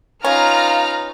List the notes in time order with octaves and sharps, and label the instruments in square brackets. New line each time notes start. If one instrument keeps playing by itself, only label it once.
[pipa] C#4 [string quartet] D#4 F4 B4 [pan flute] F5 [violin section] A#5 F6